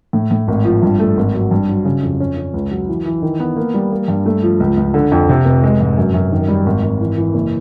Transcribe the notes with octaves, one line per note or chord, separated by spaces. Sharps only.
A2
A2
G#1
F3
G2
A3
G#1
F#3
G2
F#3
C#3
F2
C#4
C#4
C#2
F#3
E3
E3
D#3
B3
A#3
G3
A#3
G2
A3
F3
C#2
C#2
D3
F2
C3
F1
G#3
G#2
F#2
F#2
D#3
G3
G#1
G#1
E3
E3
F#1